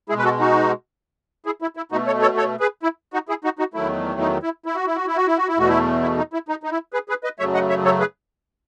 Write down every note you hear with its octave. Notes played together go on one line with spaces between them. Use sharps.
B2 G#3 E4 G#4
B4
F#4 A4
D#4 F#4
E4 G#4
E4
E4
B2 A3 D#4 F#4
A4 C#5
A4 C#5
A4 C#5
G#4 B4
E4
D#4 F#4
E4 G#4
D#4 F#4
D#4 F#4
E2 D#3 F#3 A3 E4
D#4
E4
E4
F#4
E4
F#4
E4
F#4
E4
F#4
E4
E2 B2 A3 F#4
E4
E4
D#4
E4
D#4
D#4
E4
G#4 B4
G#4 B4
B4 D#5
F#2 C#3 F#3 A3 C#5 E5
D#5 F#5
C#5 E5
A4 C#5
G#4 B4